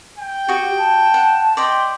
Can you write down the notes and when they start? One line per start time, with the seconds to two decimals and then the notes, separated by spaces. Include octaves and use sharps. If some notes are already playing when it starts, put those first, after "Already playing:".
0.18 G5
0.49 F#4 G4 D#6
0.78 A5
1.14 F#5
1.57 D5 D#5 G5 B5 C6